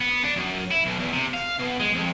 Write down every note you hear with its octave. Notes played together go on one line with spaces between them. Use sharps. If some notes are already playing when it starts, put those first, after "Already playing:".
B3
D4
F#2
E4
B1
E2
C3
F5
B2
G#3
F2